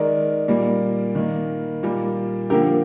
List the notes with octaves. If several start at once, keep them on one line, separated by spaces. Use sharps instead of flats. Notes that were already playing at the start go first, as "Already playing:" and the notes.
Already playing: D#3 G#3 A#4 D5
A#2 G3 A#3
D#3 A#3
A#2 G3 A#3
D3 F3 A#3 G4 A#4